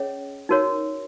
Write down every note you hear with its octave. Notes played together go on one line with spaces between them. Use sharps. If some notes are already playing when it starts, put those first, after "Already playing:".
Already playing: C#4 G#4 C#5 D#5
D#4 F#4 A#4 C#5